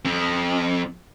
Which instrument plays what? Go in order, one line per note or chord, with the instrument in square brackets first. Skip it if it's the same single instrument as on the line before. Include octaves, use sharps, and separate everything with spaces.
[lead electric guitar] F2